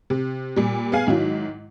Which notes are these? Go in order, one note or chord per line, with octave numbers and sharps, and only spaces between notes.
C3
A#2 G3
B3 G#4 F5 G#5
G#2 D#3 F#3 E4